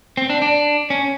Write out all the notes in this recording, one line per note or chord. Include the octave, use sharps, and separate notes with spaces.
C4
D4
D4
C#4